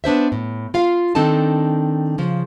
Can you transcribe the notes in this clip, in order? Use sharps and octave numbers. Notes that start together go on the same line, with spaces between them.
B3 D4 C5 E5
A2
F4 F5
D#3 C4 D4 D#4 A4 A5
C#3 F3